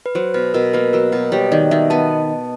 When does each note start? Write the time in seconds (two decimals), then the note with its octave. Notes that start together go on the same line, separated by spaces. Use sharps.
0.06 B4
0.15 F#3 C5
0.34 B2 B4
0.54 B2 A#4
0.74 A#3 B4
0.93 F#3 A#4
1.12 B2 B4
1.32 G3 C#5
1.52 D#3 D5
1.71 D#3 E5
1.90 B3 A5